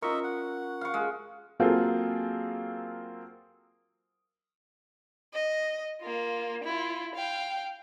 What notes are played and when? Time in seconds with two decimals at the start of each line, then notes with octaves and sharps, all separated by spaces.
0.02 C#4 D#4 F4 A#4 D#5 E5 C#6
0.24 F#5
0.81 F5 C#6
0.94 G#3
1.60 F#3 A#3 C4 F4 G#4 A4
5.34 D#5
6.01 A#3 F4
6.64 E4 F4
7.15 F5 G5